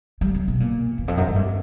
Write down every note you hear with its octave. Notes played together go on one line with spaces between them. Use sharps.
G3
C#3
B2
A#2
E2
F2
F#2
G#2
G2